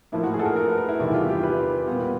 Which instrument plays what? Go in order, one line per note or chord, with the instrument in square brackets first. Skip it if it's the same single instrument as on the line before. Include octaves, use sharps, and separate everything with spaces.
[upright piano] A2 F3 A#3 E4
F#4
G#4
A4
A#4
A#4
B4
A#4
E4
E2 C3 D#3 G3 E4
F4
G4
B4
A#2 G3 B3